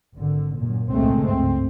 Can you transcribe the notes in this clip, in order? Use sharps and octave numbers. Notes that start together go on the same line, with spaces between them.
G#1 D3
F#2 A#2
G#1 C#2 A#2 G#3 A3 C4
G2 C4